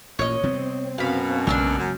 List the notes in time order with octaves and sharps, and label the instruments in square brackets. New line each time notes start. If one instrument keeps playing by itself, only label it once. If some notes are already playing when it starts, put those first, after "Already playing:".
[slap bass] A1 [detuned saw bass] A#2 [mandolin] C#5 D#5
[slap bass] C3 G3 B3 [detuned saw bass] C4
[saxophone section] F#2 B2 [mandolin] F5 B5
[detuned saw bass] C4
[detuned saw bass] B1 [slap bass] C#3 G#3 A#3 [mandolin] D4 E6 F6
[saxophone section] F#2